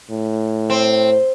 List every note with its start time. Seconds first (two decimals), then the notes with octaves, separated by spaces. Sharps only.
0.10 A2
0.70 C4